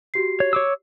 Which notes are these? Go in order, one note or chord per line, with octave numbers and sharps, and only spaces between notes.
F#4 G4 C7
C#5
C#5 D6 E6